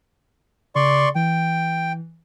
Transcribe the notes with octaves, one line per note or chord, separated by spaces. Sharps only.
C#3 D5 C6 C#6
E3 G5